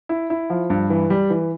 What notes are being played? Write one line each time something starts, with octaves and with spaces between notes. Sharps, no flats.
E4
E4
F3
G2
E3
G3
E3